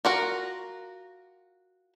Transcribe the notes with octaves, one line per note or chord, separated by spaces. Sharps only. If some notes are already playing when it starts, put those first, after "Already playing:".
F4 F#4 A#4